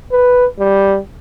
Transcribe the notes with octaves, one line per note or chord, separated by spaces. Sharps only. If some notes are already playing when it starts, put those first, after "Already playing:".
B4
G3